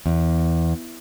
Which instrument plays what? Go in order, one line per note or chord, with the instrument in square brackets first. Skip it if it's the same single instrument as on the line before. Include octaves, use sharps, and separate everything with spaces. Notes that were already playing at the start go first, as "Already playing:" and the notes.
[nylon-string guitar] E2